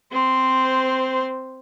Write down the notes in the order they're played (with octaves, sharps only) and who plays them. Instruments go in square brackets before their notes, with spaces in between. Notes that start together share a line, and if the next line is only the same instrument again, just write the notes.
[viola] C4 C5